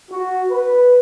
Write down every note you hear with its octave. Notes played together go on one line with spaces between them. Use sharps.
F#4
B4